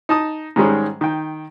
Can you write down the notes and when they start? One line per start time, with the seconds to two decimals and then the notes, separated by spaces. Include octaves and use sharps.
0.09 D#4 A5 D#6
0.56 G#2 D#3 G3 G#3 C#4
1.01 D#3 G5